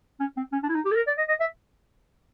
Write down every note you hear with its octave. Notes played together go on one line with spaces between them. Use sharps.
C#4
C4
C#4
D4
E4
D#4
G4
A4
A#4
D5
D#5
D#5
E5